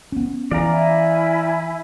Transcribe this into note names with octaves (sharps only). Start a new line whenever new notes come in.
B3 C#4
E3 D5 F5 A#5
E4 E5 G#5